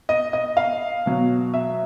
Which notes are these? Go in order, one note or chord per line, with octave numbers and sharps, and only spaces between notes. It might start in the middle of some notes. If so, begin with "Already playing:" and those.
D#5
D#5
F5
B2 F#3
E5